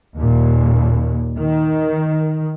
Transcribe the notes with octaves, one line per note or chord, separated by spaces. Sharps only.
D#2 A#2
D#3